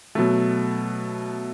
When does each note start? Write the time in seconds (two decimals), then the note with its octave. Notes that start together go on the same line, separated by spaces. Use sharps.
0.15 B2 F#3 A3